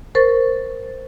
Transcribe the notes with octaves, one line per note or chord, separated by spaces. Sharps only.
A#4 C5 C#6 A6